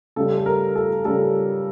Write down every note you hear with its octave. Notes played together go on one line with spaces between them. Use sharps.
C#3 G3 A4
A4
A#4
A4
C#3 G3 A4